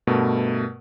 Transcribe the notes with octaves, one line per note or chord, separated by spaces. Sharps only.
G2 B2 A3 A#4